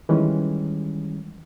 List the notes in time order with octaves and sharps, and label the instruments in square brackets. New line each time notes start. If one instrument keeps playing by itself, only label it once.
[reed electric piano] D#3 E3 G3 G#3 C#4